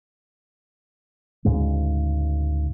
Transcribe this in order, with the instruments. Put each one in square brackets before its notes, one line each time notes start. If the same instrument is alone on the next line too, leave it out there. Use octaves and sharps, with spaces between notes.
[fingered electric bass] D2 G#2 C#3 G#3